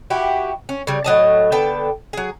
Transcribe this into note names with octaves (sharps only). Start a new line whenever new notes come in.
E4 F#4 G4
C#4
C#3 G3
A2 F#3 D#5 A5
D3 B3 G5 A5
F#3 G#4